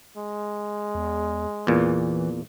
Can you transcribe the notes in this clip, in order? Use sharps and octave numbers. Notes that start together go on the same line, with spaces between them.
G#3
E2
E2 A#2 E3